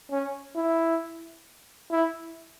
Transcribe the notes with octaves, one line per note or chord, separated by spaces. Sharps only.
C#4
E4
E4